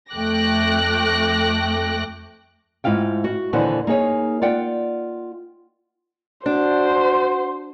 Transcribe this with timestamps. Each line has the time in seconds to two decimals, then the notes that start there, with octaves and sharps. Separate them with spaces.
0.13 F2 A3 G5 D6 F#6 A#6
2.84 G#2 E4 F4 F5 G5
3.24 F#4
3.53 D#2 A#2 D3 E3 C5 F#5
3.87 A#3 D#4 G#4 C#5
4.42 F4 D5 F#5 G5
6.46 D4 F#4 C5